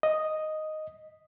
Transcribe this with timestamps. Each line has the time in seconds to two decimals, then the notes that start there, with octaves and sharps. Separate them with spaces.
0.03 D#5